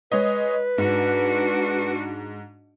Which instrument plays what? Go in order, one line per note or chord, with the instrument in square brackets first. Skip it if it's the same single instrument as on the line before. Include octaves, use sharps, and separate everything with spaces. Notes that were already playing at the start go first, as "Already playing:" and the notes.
[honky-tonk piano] G#3 C#5 D#5 [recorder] B4
[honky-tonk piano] G#2 [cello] D4 F#4